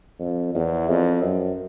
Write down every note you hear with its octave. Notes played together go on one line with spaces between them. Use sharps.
F2
E2
F2
F#2